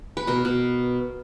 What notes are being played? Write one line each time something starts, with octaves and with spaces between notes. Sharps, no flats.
B4
B2 A#4
B2